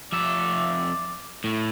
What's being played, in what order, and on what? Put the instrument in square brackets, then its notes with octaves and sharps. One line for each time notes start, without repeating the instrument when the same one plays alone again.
[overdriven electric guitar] F2 E5 [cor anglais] D5
[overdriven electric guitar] A2